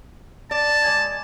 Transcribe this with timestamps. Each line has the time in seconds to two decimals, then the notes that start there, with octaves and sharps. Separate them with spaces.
0.51 D5 A5
0.85 G#3 D5 G#5